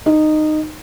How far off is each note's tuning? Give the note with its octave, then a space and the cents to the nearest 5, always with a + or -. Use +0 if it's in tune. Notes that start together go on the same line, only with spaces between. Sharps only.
D#4 -15